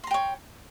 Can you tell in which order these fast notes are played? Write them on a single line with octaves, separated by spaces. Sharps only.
C6 A#5 G5 C#5